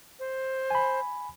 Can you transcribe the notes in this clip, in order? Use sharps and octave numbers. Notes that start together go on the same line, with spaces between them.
C5
G#5 B5